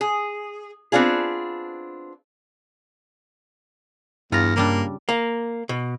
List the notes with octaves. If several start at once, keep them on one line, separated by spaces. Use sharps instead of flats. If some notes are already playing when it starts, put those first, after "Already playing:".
G#4
B3 C4 D4 F4 G#4
E2 G2 F4 A#5 F6 A#6
C#3 G3 A#3 D4
A#3
B2